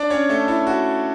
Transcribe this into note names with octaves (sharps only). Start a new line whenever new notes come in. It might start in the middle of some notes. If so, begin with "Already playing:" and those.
Already playing: D4 D5
C#4 C#5
A3 A4
E4
F#4